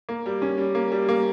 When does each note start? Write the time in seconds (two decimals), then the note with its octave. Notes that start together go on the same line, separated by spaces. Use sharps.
0.09 A#3
0.26 G3
0.42 C#4
0.58 G3
0.75 A#3
0.92 G3
1.09 A#3